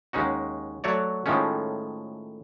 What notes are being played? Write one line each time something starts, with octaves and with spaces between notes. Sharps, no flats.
D#2 G#3 C#4 D#4 F#4
F#3 A3 F#4 C#5 D5
A2 D#3 F3 G#3 A3 C#4